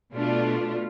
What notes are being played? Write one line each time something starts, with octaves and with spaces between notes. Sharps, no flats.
B2 A3 D4 F4